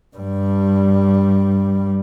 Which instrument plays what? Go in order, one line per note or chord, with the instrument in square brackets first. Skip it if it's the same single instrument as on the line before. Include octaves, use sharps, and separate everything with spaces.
[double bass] G2 G3